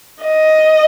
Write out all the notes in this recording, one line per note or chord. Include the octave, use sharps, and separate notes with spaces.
D#5